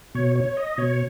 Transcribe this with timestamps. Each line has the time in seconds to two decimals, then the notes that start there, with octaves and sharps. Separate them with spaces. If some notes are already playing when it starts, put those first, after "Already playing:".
0.15 B2 C#5
0.35 C#5
0.57 D#5
0.78 B2 C#5